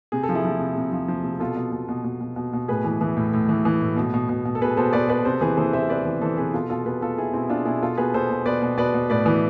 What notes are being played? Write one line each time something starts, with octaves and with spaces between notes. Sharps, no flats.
C3 G#4
A4
F3
E4 G#4
F3
C3
C3
F3
F3
C3
B2 F4 A4
B2
B2
B2
B2
B2
B2
B2
A2 G#4 B4
E3
E3
A2
A2
E3
E3
A2
B2
B2
B2
B2
A4
B2 G#4 B4
B2 A4 C5
B2 B4 D5
B2 B4 D5
C3 A4 C5
E3 G#4 B4
E3 A4 C5
C3 C5 E5
C3 B4 D5
E3
E3 A4 C5
C3 G#4 B4
B2 F4 A4
B2 F4 A4
B2 G#4 B4
B2 F4 A4
B2 E4 G#4
B2 C4 E4
B2 D4 F4
B2 E4 G#4
B2 F4 A4
B2 G#4 B4
B2 A4 C5
B2
B2 B4 D5
B2
B2 B4 D5
B2
A2 B4 D5
E3